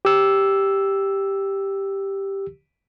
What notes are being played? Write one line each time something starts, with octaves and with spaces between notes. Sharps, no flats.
G4 E6